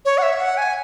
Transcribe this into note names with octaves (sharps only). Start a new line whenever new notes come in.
C#5
F#5
E5
F#5
G#5